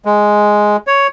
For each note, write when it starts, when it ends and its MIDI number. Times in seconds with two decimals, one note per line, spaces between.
0.05 0.77 56
0.87 1.07 73